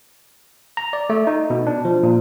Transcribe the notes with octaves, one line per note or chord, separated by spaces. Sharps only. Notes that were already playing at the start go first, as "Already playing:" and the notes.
A#5
D5
A3
D#4
B2
D4
F3
A#2